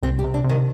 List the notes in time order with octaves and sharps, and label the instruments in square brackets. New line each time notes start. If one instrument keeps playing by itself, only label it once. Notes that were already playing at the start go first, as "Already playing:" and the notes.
[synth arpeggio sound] C2 [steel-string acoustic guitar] C4
[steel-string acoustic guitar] G4
[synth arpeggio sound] C3
[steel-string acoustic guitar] D4
[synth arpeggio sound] C3
[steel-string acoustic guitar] D#3